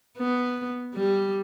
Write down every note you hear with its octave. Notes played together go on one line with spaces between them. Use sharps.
B3
G3